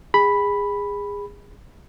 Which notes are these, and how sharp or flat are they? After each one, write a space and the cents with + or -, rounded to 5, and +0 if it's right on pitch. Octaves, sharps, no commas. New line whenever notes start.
G#4 -25 B5 +0